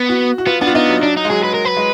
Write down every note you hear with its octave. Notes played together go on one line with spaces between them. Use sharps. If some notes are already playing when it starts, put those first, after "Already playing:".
Already playing: B3
F#4
F#4
B3 F4
B3 D4
F4
B3 D#4
F#3
D4
D#4
G#3
F#3 G#4
B4
A#4
B4
G#3